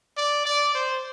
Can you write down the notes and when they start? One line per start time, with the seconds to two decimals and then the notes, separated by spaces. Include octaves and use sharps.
0.17 D5
0.46 D5
0.75 C5